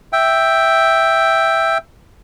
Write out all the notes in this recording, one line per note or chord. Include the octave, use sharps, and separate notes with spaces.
E5 G5